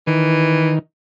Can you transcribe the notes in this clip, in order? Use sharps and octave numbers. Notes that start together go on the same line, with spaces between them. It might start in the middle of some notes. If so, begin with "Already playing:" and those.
D#3 E3